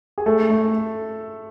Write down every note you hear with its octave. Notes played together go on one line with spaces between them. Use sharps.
G#4
A3 A4
A3